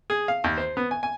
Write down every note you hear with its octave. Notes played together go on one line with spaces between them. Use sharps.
G#4
F5
D#2
C5
B3
G#5
G#5